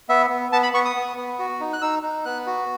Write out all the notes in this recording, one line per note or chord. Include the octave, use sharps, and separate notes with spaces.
B3 E5
B3
B3 A5
B5
B3 C#6
D#6
B3
B3
F#4
D#4
F#6
D#4 E6
D#4
B3 F#6
F#4